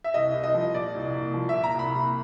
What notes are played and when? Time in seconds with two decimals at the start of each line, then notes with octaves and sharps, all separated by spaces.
0.04 E5
0.14 C2 D#5
0.34 C2
0.44 D#5
0.54 F3
0.74 A#2 D5
0.95 C2
1.14 C2
1.34 F3
1.49 E5
1.54 A#2
1.64 A#5
1.74 C2
1.79 B5
1.94 C2